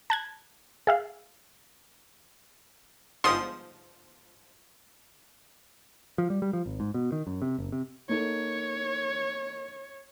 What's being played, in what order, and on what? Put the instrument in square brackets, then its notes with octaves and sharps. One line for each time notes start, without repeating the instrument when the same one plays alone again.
[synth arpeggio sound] A5 F#6 G#6
G#4 E5 F5
[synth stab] G1 G#2 F3 [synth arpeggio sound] C6 D#6
[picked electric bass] F3
G3
G3
F3
G#1
G#2
B2
D#3
F#2
C3
F#1
C3
[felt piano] A#3 D#4 A4 [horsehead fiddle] C#5